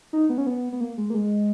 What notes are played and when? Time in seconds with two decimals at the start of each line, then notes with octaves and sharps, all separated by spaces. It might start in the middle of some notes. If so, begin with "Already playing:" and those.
0.13 D#4
0.30 B3
0.38 C#4
0.47 B3
0.73 B3
0.81 A#3
0.98 G#3
1.10 A#3
1.14 G#3